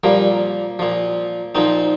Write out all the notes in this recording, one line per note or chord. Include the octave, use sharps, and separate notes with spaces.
A#2 F3 G3 A#3
A#2 F3
A#2 F3 C4 D#4